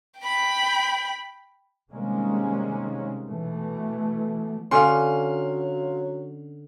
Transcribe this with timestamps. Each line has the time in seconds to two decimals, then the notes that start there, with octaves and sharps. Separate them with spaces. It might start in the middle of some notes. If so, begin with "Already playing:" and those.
0.19 G5 B5
1.90 C3 D#3 G3 G#3 A#3 C#4
3.28 B2 E3 A3
4.71 D3 F#3 C#4 D5 F5 C6